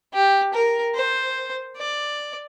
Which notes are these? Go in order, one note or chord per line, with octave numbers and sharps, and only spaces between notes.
G4
A#4
C5
D5